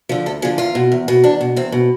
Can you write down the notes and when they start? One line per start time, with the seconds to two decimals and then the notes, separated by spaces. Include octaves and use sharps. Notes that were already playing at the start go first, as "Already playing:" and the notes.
0.09 D3 F3
0.26 D2 A4
0.42 D3 F3 G#4
0.58 E2 F4
0.75 B2
0.92 E2
1.08 B2
1.24 E2 D4
1.41 B2
1.56 E2 C4
1.72 B2